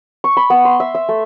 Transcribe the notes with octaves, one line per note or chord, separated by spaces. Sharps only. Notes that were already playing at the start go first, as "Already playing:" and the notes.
C#6
B5
B3
C6
E5
E5
A3